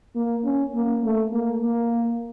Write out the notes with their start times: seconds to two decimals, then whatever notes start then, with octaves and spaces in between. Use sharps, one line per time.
0.16 A#3
0.45 C#4
0.74 A#3
1.04 A3
1.33 A#3
1.62 A#3